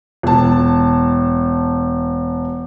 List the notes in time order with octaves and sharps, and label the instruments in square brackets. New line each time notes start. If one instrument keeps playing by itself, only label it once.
[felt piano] E1 A5